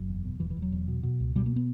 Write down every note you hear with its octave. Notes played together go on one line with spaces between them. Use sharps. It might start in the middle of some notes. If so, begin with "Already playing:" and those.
Already playing: F#1 F#3
E2
B2
E1 E3
E3
E1
F#3
E2
B2
B2
C#2
B2 G3
A#3
B3